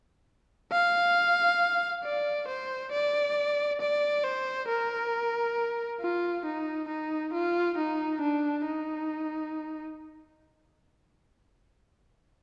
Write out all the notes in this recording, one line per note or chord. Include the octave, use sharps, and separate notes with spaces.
F5
D5
C5
D5
D5
C5
A#4
F4
D#4
D#4
F4
D#4
D4
D#4